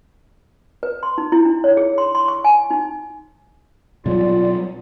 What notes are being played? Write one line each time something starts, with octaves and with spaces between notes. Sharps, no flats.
B4
C6
D#4
E4
D4
C#5
G#4
C6
C6
C#6
G#5
D#4
B2 F#3 G3 F4 D5